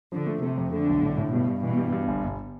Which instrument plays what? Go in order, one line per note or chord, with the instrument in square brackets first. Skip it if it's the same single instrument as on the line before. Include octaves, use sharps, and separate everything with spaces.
[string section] D3 [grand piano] F3
[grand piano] A3
[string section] C3 [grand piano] A3
[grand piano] F2
[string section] D3 [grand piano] A3
[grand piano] B1
A2
A2
[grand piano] G2 [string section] B2
[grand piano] G2
[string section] B2 [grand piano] E3
[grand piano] G2
G2
G1
G1